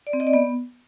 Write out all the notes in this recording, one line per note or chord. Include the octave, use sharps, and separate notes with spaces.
D5
C4
D#5
D5
B3